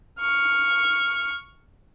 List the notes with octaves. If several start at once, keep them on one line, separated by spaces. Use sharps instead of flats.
C#6 F6